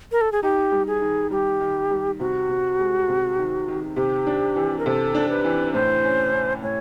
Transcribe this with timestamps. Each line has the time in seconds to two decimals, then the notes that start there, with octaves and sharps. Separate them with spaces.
0.12 A#4
0.21 A4
0.32 G#4
0.43 D#4 G4
0.72 G3
0.87 G#4
1.01 D#3
1.31 G3 G4
1.60 D#3
1.91 G3
2.20 C3 F#4
2.49 C3
2.79 G#3
3.08 C3
3.38 D#3
3.68 D#3
3.96 C3 G4
4.27 D4
4.56 E3
4.79 A#4
4.86 C3 A4
5.15 D4
5.30 B4
5.45 E3
5.74 A2 C5
6.04 C#4
6.33 C#4
6.63 A2 C#5